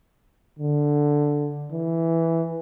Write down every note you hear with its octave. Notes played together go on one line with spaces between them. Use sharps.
D3
E3